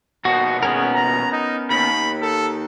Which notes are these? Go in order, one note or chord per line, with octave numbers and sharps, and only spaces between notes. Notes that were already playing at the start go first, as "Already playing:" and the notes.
D#2 B2 B3 F#4
B3 C#4 G#4 A#4
A#5
D#4
D#2 B5
A4